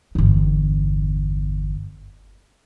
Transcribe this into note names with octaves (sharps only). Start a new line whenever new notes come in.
G1 E2